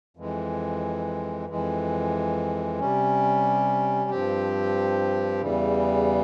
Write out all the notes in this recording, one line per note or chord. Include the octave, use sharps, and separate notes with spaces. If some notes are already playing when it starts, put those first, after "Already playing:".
F2 E3 G#3
F2 E3 G#3
C3 G3 C#4
G2 F3 C4 G4
E2 C#3 E3 G3